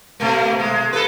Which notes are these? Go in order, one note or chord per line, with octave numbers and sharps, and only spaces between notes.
B2 A3 A#3
G#3
A4 B4